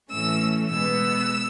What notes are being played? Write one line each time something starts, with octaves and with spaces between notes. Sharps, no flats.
A2 E3 A3 C#4 E6
B2 G#3 B3 E6